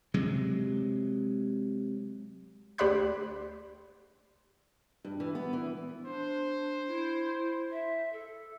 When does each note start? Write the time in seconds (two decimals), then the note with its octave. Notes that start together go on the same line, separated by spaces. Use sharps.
0.14 C3 F#3 G#3
2.78 D2 G4 C5 D5 B5 F#6
5.05 G2
5.20 E3
5.35 B3
5.53 E3
6.05 D4 C5
6.87 E4
7.71 E5
8.13 A4